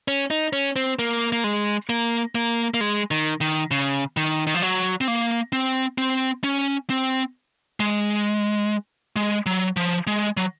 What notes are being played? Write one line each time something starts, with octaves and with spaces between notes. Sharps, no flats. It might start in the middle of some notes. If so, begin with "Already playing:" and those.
C#4
D#4
C#4
C4
A#3
A#3
G#3
A#3
A#3
A#3
G#3
D#3
D#3
C#3
D#3
D#3
F3
F#3
C4
A#3
C4
C4
C#4
C4
G#3
G#3
F#3
F3
G#3
F#3